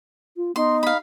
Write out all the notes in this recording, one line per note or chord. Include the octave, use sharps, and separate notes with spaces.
F4
B3 D#4 C6
F5 B5